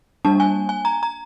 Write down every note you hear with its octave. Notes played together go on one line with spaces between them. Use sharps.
G3 A#3 D4 A5
G#5
G#5
A#5
A#5